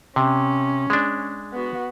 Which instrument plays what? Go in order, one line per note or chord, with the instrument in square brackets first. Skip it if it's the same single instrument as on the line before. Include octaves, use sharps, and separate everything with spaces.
[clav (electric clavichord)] C3 [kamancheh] C#4
[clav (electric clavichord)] G#3 D4
[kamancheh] B3 F#4